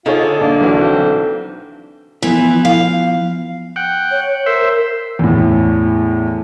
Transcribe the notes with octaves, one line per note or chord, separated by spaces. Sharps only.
D3 D#4 F4 G#4 C#5
A#3 D4
B1 E3 F#4
C4
E3 F3 B3 B4
F5
F#5 G5
C#5
A#4 C5 E5
E2 A2